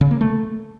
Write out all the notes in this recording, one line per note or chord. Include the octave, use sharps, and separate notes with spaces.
C#3
A#3
A3